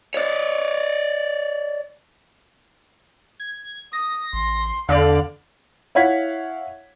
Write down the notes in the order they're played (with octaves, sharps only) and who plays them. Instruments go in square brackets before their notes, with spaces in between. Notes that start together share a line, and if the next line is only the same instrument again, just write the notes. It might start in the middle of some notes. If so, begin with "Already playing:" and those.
[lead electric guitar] C#5 D5
[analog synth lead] G#6
[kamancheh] D#6 [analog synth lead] A#6
[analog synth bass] A1 [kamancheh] C6
[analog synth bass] E2 [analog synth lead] D3 [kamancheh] D5 F5
[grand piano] E4 C#5 F5 F#5 G#6 B6